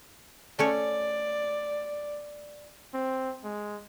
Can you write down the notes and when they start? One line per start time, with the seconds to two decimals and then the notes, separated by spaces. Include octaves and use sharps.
0.59 A3 C#4 C#5 D5
2.94 C4
3.44 G#3